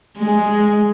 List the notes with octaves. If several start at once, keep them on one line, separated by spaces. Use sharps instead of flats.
G#3